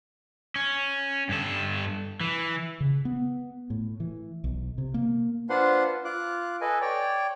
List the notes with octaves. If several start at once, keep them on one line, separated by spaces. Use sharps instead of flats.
C#4
G2 A4
E3
C#3
B3
A2
E3
B1
C3
A#3
D4 F4 B4 C5 F#5 C6
F4 D6 F#6
A4 B4 D#5 G#5
C#5 D5 G5